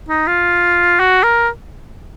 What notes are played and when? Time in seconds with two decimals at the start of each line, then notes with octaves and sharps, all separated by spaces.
0.09 D#4
0.27 F4
1.00 F#4
1.23 A#4